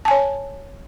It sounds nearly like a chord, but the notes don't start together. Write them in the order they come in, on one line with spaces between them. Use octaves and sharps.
A5 G#5 C#5